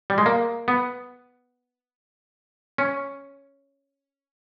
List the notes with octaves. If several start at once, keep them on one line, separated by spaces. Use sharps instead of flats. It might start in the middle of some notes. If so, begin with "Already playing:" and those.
G3
G#3
A#3
B3
C#4